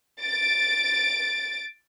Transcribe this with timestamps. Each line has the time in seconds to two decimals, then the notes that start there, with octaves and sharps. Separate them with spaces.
0.21 A6 D7